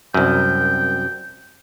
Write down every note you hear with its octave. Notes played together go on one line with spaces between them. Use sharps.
C2 F#2 G5